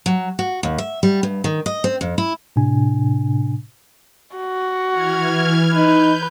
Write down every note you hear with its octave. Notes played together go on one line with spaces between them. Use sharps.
F#3
F#4
D#2
E5
G3
G2
D#3
D#5
C4
F2
E4
A2 C3 D4 G#5
F#4
E3 F6 G#6
D#4 B4 G6